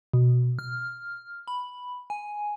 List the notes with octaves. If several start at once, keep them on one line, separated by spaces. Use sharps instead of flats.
B2
F6
B5
G#5